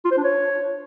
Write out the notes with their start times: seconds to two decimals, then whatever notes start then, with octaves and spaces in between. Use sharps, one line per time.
0.05 F4
0.11 C5
0.17 D4
0.24 C#5